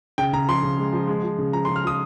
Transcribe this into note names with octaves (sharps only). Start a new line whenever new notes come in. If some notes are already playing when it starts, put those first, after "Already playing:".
C#3 G5
C#3 A#5
F3 C6
C#3
G#3
F3
G#3
F3
C#3
F3 A#5
C6
C#3
F6
F3 D#6